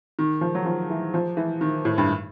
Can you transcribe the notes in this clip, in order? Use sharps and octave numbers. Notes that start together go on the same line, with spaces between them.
D#3
F3
F#3
F3
E3
F3
E3
D#3
A2
G2